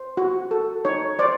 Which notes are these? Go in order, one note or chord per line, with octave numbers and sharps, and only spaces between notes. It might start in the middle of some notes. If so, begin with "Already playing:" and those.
Already playing: C5
F#4
A4
D#4 C#5
C5 D5